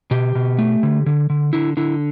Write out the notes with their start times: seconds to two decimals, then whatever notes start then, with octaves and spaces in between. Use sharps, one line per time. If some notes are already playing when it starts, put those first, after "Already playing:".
0.11 B2 G4
0.35 B2
0.59 A3
0.83 D3
1.06 D3
1.30 D3
1.53 D3 E4
1.77 D3 E4